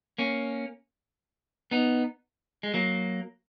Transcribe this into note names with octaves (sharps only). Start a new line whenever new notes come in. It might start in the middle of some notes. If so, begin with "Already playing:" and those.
A#3 C#4
B3 D#4
G#3
F#3 A#3